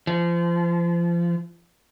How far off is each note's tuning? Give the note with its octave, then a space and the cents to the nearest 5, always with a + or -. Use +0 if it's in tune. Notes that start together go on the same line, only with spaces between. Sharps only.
F3 -30